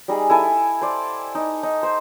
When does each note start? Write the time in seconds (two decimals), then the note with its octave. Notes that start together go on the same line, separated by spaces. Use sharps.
0.08 G3 D#4 G#4
0.30 E4 A4 G#5 A5
0.81 C5 D5
1.35 D#4
1.63 D#4
1.83 C5